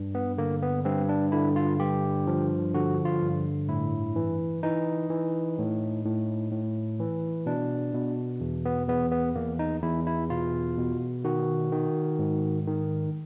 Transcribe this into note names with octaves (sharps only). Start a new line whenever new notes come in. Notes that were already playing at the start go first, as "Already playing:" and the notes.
Already playing: G2
B3
D3 A#3
B3
G2 C4
D4
D3 E4
F4
G2 G4
F3
D3 F#4
F4
G2
A2 E4
E3
E3 D#4
E3
A2
A2
A2
E3
B2 D4
B2
E2
B3
E2 B3
B3
E2 A#3
D#4
E2 E4
E4
B2 F4
B2
D#3 F#4
D#3
G#2
D#3